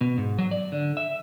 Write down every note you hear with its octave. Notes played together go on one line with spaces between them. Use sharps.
B2
G#2
F#3
D5
D3
E5